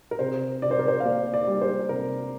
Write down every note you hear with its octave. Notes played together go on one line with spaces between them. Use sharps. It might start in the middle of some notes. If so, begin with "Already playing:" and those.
A#4
C3 C5
C3 D5
C5
A#4
C5
F5
A#3 D5
D5
G3
C5
C3 A#4